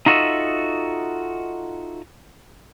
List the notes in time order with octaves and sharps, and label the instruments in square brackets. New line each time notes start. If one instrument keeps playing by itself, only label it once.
[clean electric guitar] D#4 F4 F#4 A4 D#5 E5